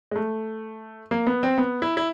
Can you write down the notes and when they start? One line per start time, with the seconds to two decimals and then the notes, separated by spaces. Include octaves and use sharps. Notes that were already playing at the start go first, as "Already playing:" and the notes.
0.11 G#3
0.16 A3
1.11 A#3
1.27 B3
1.43 C4
1.58 B3
1.82 E4
1.97 E4